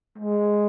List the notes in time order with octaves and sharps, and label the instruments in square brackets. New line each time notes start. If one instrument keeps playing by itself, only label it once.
[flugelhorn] G#3